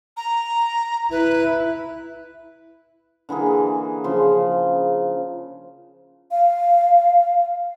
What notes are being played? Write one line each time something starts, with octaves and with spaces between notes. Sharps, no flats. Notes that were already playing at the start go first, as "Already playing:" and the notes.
A#5
E4 B4
D3 E3 A#3 G#4
C#3 F3 C6
F5